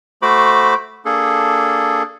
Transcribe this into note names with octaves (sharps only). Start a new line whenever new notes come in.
A3 F#4 C5 B5 D6
A#3 D4 G#4 A4